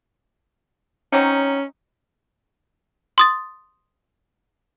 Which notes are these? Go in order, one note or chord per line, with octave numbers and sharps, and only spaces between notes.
F#3 C4 C#4 D#4
C6 D#6 A6